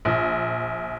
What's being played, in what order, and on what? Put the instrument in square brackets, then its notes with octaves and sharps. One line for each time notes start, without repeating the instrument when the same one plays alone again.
[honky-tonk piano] A#1